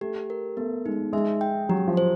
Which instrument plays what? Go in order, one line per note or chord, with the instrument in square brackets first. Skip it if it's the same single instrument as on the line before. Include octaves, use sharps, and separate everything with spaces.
[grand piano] A3 [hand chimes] G4
[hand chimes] A#4
[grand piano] A3 [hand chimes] B3
[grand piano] G#3 [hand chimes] D#4
[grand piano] G#3 [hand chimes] E5
[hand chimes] G5
[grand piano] F#3 [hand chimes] G4
[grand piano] F3
[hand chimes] C5